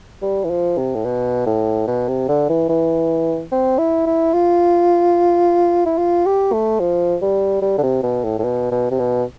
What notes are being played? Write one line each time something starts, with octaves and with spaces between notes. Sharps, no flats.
G3
E3
F3
C3
A2
B2
A2
B2
C3
D3
E3
E3
C4
E4
E4
F4
E4
F4
G4
A3
F3
G3
G3
D3
C3
B2
A2
A2
B2
B2
C3
B2